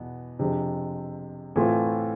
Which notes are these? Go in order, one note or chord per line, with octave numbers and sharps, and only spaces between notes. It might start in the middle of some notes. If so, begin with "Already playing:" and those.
Already playing: E2 B2 B3
F2 C3 G#3 D4
A2 E3 A3 C4 F4